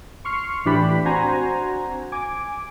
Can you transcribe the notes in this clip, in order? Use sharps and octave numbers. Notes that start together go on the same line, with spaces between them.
C6 C#6 F6 C7 C#7
A2 E3 D4 G4 B5
C4 D4 F#4 C5 G#5 A#5
G#5 D6